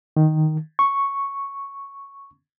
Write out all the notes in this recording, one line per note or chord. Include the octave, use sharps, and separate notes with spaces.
D#3
C#6